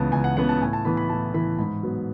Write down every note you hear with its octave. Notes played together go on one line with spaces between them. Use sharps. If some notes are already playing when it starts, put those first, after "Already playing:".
Already playing: C#2 C#3 E3 B3 A5
C#2 G#5
F#5
C#3 E3 B3 F#5
A5
A2 G#5
A5
E3 B3 B5
B5
A2 A5
E3 B3 B5
G#2 B5
F#3 B3